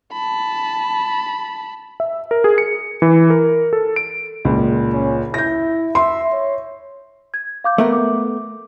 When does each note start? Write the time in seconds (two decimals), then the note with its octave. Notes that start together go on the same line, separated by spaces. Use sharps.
0.13 A5 B5
2.00 E5
2.31 A#4
2.44 G#4
2.58 C#7
3.02 E3
3.30 A#4
3.73 A4
3.96 D7
4.45 C#2 A#2
4.93 C#4
5.34 E4 G6 A#6
5.95 E5 C6
6.32 C#5
7.34 G#6
7.64 F5 D6 G6
7.78 A3 B3 A#4 E5
7.93 D6